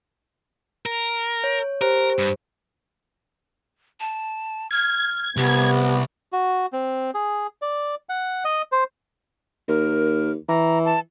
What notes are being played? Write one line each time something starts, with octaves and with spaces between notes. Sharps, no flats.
A#4
C#5
G4 A#4 C5
G2
A5
F6 G#6
C2 B3 G4
F#4
C4
G#4
D5
F#5
D#5
C5
D#2 A#4
E3 A#5
A5